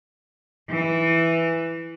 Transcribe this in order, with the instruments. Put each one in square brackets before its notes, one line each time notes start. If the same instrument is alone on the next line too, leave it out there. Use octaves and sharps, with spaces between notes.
[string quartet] E3